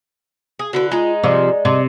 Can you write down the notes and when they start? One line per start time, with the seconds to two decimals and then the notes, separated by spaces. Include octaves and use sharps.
0.59 G#4
0.73 D3 E4 F#4 B4
0.92 G#3 D#4 F4
1.23 C3 F3 D5
1.65 C3